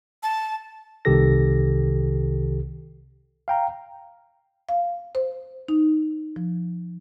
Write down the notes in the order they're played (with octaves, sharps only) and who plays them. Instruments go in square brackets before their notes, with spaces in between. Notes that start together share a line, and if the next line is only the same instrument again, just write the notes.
[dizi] A5
[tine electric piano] C2 C3 D#3 G4 A4 A#6
F5 G5 A#5
[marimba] F5
C5
D#4
F3